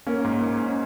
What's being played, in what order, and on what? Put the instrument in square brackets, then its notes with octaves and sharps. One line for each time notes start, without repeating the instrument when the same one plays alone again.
[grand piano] A#3 [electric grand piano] C#4
[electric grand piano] G#2
G#2
C#4